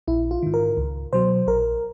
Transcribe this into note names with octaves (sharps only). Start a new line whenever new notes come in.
A#1 E4
F4
G#2 D#3
A#4
C#2
B2 F#3 C5
A#1 A#4